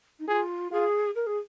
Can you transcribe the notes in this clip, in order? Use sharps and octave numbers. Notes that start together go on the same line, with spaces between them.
D#4
F4 G#4
F4 G#4
A#4
G#4